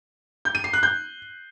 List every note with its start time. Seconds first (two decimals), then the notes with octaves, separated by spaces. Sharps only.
0.45 G6
0.55 D#7
0.64 C7
0.73 F#6
0.83 G6